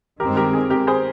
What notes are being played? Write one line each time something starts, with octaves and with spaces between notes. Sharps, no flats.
G2 D#3 G#3 C4 G4 A#4
G4 A#4
G#4
G4 A#4
G#4 C5